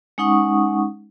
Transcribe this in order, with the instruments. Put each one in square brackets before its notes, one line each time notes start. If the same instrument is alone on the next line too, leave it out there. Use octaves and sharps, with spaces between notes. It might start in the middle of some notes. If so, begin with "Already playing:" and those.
[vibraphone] G#3 C#4 D#4 F#5 C#6 D#6